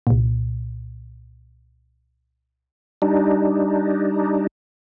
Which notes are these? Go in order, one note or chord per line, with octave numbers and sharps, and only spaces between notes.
C2 A#2
G3 D4 D#4